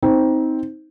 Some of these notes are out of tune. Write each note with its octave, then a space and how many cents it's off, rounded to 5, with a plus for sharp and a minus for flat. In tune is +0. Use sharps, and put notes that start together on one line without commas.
C4 +0 D#4 +20